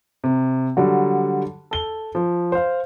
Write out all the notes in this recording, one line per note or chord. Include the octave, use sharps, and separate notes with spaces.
C3
D3 F#3 G3 F#4
A4 G7
F3
C5 F5